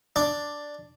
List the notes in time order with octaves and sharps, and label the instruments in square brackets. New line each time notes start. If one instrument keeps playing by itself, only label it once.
[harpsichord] D4